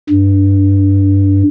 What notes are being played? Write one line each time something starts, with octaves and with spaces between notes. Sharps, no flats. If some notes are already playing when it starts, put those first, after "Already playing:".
G2